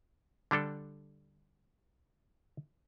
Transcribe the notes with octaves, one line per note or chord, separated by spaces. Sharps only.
D3 G3 D4 A4